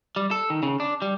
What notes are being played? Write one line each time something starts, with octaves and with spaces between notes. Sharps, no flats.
G3
A4
D#3
C#3
D4
G3